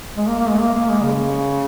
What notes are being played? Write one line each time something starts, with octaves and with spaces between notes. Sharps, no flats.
G#3
A#3
A#3
G#3
A#3
A#3
G#3
C#3